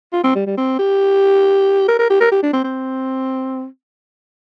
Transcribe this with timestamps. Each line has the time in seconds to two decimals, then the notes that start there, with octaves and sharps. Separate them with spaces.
0.13 F4
0.24 C4
0.35 G3
0.47 G3
0.58 C4
0.79 G4
1.88 A#4
1.99 A#4
2.10 G4
2.21 A#4
2.32 G4
2.43 D4
2.53 C4
2.64 C4